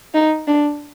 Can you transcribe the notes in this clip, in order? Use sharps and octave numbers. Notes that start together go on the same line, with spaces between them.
D#4
D4